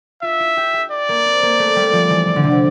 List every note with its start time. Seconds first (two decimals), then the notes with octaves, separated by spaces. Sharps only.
0.22 F4 E5
0.40 E4
0.57 G4
0.74 G4
0.91 D5
1.09 A#3
1.25 C4
1.43 A#3
1.59 A3
1.76 G3
1.93 F3
2.10 E3
2.27 E3
2.36 D3
2.43 C3
2.52 D3